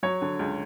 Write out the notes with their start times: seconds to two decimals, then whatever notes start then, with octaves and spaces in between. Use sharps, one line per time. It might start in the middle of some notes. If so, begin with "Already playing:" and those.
0.03 F#3 C#5
0.22 D3
0.39 C#2